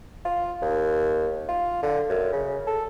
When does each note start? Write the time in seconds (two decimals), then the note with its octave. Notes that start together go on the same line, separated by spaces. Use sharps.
0.25 F4
0.62 D#2
1.48 F4
1.82 D3
2.09 F#2
2.33 C#3
2.67 A4